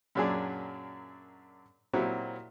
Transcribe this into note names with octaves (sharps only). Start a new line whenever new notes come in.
F#2 A#2 F#3 D4 G#4 D5
A#2 F#3 C4 E4 F#4 G4